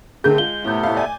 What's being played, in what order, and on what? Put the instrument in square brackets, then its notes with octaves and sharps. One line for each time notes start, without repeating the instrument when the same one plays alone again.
[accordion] G2 A3 C4 [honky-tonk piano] D3 A#4 G6 [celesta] G#4
[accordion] G#3 [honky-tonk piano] F4 [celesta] G7
[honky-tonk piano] A2 G6 [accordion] C3 A3 B3
[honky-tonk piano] A2 F5
D5 G#5